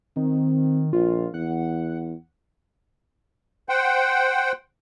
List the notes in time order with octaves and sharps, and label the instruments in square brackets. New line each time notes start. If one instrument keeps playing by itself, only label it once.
[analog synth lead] D#3 [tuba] C4
[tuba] A#1 [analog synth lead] F4
[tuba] E2 [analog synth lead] F#5
[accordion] C5 F#5 G5